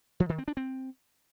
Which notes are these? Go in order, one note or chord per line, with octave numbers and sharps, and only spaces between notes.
F3
D#3
C4
D4
C4